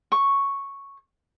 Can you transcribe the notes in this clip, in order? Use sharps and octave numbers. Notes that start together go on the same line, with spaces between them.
C#6